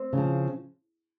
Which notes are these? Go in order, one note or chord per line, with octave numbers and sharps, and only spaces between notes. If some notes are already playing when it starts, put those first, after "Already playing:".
Already playing: C4
C#3 F3